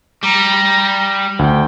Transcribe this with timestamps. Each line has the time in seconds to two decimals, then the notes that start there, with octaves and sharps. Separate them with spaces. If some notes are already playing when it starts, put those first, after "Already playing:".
0.24 G3 A#5
1.39 D2 G5